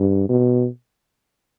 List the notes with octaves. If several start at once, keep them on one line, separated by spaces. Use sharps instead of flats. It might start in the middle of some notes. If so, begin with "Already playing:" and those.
Already playing: G2
B2